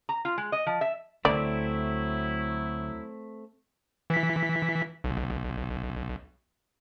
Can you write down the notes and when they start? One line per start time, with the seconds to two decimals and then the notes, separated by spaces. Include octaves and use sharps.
0.09 A#5
0.25 F4
0.38 G#3
0.52 D#5
0.67 F3
0.81 E5
1.25 D2 F#3 A3 C4 E4 D5
4.10 E3 B6
5.04 B1